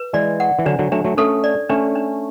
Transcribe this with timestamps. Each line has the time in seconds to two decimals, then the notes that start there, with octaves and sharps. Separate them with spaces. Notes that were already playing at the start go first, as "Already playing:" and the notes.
Already playing: B4
0.13 E3 G#3 D5
0.40 F#5
0.59 E3
0.66 D3 F#3 D4
0.79 D3 F#3
0.92 F#3 A3 D4
1.05 F#3 A3
1.17 A3 C#4 A4
1.44 D5
1.70 A3 C#4 D4
1.95 D4